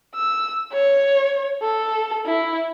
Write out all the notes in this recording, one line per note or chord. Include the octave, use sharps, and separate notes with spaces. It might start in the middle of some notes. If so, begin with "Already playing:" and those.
E6
C#5
A4
E4